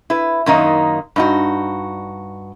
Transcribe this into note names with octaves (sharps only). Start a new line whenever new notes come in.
E4 B4
F#2 D#3 A#3 D#4
G2 D#4 F#4